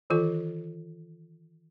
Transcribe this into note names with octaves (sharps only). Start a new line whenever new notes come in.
D#3 E3 F4 A4